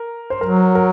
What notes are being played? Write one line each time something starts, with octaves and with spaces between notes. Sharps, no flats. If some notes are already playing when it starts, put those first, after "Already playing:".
Already playing: A#4
C5
F#3 A#4
A#4